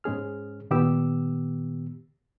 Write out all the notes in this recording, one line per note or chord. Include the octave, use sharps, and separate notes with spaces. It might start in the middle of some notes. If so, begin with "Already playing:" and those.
G#2 G#3 C#4 G#4 F6
A#2 D#3 B3 G4 D6 E6